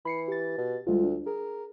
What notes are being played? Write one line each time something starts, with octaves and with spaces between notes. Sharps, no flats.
E3 B5 C7 C#7
G4 A6
B2
D2 G3 G#3 F4
D4
G#4 A#4